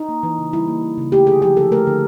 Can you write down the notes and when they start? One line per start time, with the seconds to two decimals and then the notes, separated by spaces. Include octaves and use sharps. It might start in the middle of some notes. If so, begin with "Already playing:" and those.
Already playing: D#4
0.09 A#3
0.23 E3
0.38 C#3
0.53 G3 E4
0.68 A#3
0.83 E3
0.98 C#3
1.12 A3 G4
1.27 D3 G#4
1.42 F3 G4
1.57 D3 A4
1.72 A3 A#4
1.87 D3